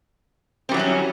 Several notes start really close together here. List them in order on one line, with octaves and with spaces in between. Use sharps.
C4 G3 F#3 E3 C#4